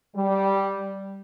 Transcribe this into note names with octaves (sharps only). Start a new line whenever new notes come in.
G3